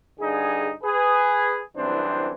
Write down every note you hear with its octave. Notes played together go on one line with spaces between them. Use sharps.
G2 D3 D#4 G#4
G#4 B4
C2 F#2 E3 C4 D4 C5